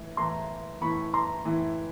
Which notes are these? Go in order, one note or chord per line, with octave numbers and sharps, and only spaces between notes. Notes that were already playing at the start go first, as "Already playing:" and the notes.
Already playing: A2 E3
A2 E3 A#5 C6
A2 E3 B5 C#6
A#5 C6
A2 E3